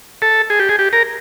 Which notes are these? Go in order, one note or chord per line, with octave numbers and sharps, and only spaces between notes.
A4
G#4
G4
G#4
G4
A#4